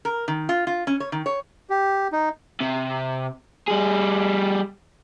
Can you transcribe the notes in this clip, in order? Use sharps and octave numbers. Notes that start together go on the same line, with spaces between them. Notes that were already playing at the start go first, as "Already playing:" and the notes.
A#4
D#3
F4
F4
C#4
C#5
D#3
C#5
G4
D#4
C3
G3 G#4